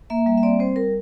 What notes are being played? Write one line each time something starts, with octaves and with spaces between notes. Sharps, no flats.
A#3 E5
G3 E5
E5
C4 D5
C4 C5
G3 A#4